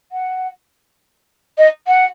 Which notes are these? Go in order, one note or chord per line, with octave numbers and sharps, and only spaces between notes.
F#5
D#5
F#5